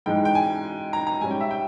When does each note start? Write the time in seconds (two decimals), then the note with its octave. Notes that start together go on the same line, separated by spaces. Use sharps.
0.06 G#2 E3 G#3 D#4 G5
0.25 G5
0.35 G#5
0.93 A#5
1.07 A#5
1.21 G#2 G3 C#4 G#5
1.31 G5
1.41 E5
1.51 G5